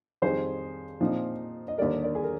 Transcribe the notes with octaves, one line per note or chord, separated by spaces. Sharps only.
F2 D#3 G3 G#4 C5
A#2 F3 C4 D#4
D#5
D#2 D3 G3 A#4 D5
A#4 D5
G#4
A#4